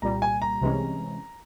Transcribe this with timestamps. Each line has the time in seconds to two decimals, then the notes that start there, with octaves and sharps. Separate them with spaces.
0.02 C2 A#2 G3 A#5
0.22 G#5
0.42 A#5
0.61 C2 C3 E3 G#3 C#4